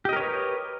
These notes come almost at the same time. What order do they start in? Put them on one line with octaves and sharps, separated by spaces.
G4 D#5 A#4 C#5 B4